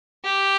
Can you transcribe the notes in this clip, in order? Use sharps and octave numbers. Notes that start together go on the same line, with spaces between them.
G4